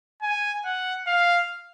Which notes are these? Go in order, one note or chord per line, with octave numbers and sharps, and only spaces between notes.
G#5
F#5
F5